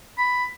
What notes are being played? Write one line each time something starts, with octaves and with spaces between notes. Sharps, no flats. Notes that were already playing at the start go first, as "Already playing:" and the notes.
B5